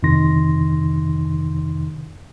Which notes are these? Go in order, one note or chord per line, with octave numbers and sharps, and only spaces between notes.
F2 C3 D#3 D#4 C6 A#6